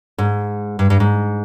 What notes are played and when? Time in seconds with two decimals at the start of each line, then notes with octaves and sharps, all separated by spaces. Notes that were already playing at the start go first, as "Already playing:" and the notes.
0.18 G#2
0.79 G2
0.90 G2
1.00 G#2